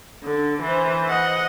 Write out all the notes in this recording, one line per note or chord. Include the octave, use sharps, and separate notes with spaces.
D3
E3 C5
D#5 F#5